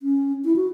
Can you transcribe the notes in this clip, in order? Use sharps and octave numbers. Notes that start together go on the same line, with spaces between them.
C#4
E4
F#4